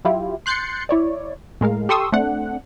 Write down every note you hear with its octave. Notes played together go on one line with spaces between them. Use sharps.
F#3 E4 F4 G4
C6 F#6 G6 A6 C7 C#7
E4 C#5 D5
A2 G#3 A#4 F5
G4 A4 C6 C#6 D#6 E6
A3 C4 D4 F#5